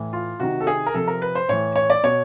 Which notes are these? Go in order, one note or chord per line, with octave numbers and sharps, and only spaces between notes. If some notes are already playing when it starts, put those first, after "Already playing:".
Already playing: A2 E3
F4
C3 D#3 F#4
A4
G#4
A#4
C3 F3 A4
A#4
B4
C5
A2 E3 C#5
C#5
D5
B2 C#5